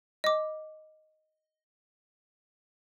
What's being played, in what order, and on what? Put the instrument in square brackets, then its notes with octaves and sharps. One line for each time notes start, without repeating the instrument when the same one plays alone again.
[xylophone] D#5 D6